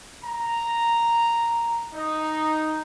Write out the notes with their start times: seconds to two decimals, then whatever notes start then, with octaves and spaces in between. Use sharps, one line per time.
0.24 A#5
1.93 D#4